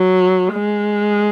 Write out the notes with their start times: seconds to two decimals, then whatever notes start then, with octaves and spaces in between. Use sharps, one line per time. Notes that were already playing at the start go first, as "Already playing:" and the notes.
Already playing: F#3
0.53 G#3